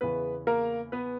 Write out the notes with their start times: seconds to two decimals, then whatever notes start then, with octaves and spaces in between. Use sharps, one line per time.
0.01 E2 C#3 E3 B3 B4
0.47 A#3 A#4
0.92 B3 B4